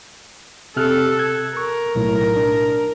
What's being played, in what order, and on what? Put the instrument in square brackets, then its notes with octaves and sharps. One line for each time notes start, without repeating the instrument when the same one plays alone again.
[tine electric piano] C3 F6 F#6 [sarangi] A4
[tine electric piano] F#6 G#6
[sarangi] A#4 [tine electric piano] C#6
[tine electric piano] B1 A2
D4